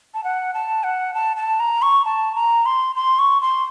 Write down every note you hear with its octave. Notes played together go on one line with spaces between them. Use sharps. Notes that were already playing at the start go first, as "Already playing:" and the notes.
A5
F#5
A5
F#5
A5
A5
A#5
C#6
A5
A#5
C6
C6
C#6
C6